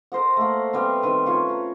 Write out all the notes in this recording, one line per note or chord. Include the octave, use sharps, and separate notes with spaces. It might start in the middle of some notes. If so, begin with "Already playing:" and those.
A#4 C5 D#5 F#5
A3 A#3
G3 B3 C4
D#3 C4 B4
C#4 F4 C#6
A#5